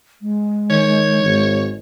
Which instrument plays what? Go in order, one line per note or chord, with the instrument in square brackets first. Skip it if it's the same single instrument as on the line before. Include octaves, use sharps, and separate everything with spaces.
[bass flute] G#3
[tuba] D#3 [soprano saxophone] C#5
[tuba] G#1